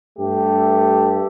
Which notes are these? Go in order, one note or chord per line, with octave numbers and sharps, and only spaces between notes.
G2 A3 G4